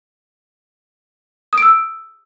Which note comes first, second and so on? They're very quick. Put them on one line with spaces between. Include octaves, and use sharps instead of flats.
D#6 D7 E6